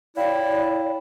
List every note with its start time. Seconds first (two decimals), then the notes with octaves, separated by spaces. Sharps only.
0.17 E4 C#5 D5 F5 G5